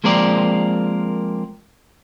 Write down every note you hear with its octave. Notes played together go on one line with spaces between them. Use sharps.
F3 G#3 A#3 C4 A#4 D5